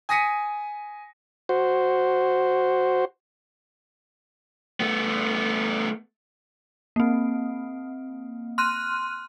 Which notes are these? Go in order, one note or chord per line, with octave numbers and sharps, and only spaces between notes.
G#5 D#6 A#6 B6 C#7 D#7
F#4 C5
A3 B3
A#3 C4
C6 F6 F#6 D#7